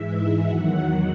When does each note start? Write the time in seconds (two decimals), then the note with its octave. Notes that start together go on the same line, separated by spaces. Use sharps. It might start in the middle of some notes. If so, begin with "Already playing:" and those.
Already playing: G#2 E3 G#3 E5
0.43 E2 D#3 F#3 F#5